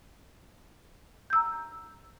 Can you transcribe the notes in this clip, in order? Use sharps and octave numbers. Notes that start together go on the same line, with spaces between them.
A#5 E6 G6